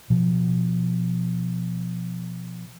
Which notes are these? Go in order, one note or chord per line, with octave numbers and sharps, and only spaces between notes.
B2 F3